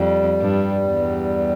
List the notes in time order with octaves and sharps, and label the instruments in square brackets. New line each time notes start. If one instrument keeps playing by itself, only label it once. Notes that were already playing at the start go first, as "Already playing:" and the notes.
Already playing: [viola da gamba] F2 [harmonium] G3
[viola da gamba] G2
E2